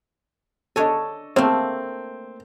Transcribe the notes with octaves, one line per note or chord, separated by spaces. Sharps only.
D4 A4 C#5 D#5 G#5
A3 A#3 C4